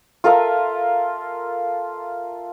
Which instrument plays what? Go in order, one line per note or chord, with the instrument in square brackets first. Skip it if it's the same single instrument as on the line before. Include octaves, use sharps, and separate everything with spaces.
[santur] F4 A4 A#4 E5